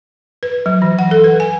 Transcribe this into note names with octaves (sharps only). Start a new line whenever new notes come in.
B4
F#3
E3
F#5
A4
B4
G#5